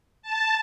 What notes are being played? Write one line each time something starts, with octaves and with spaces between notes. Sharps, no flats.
A5